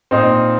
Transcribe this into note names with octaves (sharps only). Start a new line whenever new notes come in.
A#2 C4 D#4